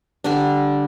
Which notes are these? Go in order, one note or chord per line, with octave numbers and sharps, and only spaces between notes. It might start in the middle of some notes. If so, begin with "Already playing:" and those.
D3 G3 D4